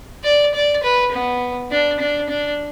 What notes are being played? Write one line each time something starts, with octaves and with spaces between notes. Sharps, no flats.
D5
D5
B4
B3
D4
D4
D4